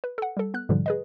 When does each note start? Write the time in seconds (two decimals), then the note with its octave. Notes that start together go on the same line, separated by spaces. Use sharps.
0.04 B4
0.18 A4 F#5
0.37 G3 A4
0.54 B3 F#6
0.69 G#2 B2 D3 F3 G3
0.86 G#4 B4 D#5